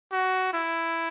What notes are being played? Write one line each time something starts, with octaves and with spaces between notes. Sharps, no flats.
F#4
E4